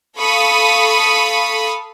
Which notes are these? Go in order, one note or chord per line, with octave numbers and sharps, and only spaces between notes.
A4 F5 B5 C#6 D#6